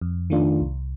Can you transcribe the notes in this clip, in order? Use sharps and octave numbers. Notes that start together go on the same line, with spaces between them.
F2
D#3 A3 D4 F4
C2